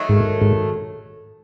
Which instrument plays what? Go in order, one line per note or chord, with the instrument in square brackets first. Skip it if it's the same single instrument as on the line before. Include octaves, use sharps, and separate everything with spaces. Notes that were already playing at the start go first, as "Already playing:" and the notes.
Already playing: [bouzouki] D#3 F#3 A3
[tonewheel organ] G#2
G#2